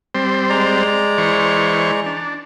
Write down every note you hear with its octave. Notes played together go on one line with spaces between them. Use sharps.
G3 C4 C5
G#3 D5 A#5
E3 C5 C#6
D4